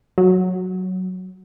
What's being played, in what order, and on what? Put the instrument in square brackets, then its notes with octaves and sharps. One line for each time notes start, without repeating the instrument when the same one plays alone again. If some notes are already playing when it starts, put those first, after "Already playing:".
[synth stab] F#3